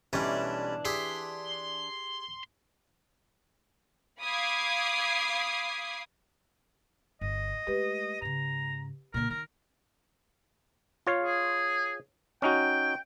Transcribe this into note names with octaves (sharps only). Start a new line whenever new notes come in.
B1 E3 G3 C#4 D4
G4 G#4 E5 C6
F5 B5 D6 D#6 G#6 C7
G1 D#5
G#3 A3 G4 B4
G#2 C#3 A#5
A#2 D3 A#4
D#3 A#4
F4 C#5 F5
G#4
C#4 D#4 F#4 G5